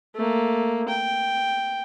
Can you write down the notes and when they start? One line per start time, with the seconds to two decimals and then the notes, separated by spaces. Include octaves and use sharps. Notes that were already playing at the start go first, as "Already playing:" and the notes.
0.15 A3 A#3
0.88 G5